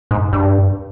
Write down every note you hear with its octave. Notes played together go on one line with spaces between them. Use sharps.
G#2
G2